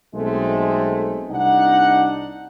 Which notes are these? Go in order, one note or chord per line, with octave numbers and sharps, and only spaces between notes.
B1 G#3 A3 C4
C2 D4 D#4 F#5